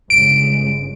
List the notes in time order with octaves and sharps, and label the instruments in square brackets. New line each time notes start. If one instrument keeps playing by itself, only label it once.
[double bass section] G1 C#3 G#3 [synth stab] D7